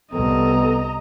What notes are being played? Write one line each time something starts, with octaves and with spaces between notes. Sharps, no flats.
C2 B3 A4 D#5 A#5